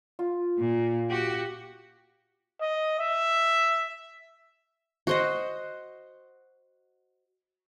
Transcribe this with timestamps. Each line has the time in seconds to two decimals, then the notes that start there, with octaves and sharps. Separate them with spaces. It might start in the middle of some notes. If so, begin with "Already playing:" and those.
0.19 F4
0.58 A#2
1.10 F#4 G4
2.61 D#5
2.99 E5
5.07 F#4 C5 D#5